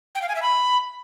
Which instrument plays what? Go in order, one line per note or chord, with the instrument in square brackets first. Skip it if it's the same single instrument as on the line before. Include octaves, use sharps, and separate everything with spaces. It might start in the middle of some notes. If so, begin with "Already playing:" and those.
[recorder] G5
F5
G#5
E5
B5